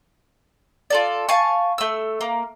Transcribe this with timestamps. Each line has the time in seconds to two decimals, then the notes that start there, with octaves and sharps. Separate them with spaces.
0.90 F4 A4 D5
1.29 F5 G#5 A5 C#6
1.78 A3 E6
2.21 A#3